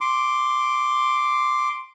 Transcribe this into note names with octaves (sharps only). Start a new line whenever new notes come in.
C6 D6